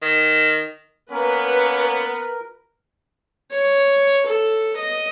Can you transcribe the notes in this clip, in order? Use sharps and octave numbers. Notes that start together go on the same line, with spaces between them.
D#3
A#3 B3 C#4 A#4 B4
C#5
A4
D#5